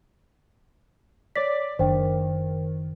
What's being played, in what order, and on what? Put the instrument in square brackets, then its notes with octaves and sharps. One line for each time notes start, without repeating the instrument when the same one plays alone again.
[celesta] C#5 B6 [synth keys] D5 D6
[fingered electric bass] F#1 D4 [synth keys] D#3 [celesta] C5 G5